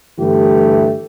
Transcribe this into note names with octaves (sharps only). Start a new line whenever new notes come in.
G2 D3 E3 A3 E4 G4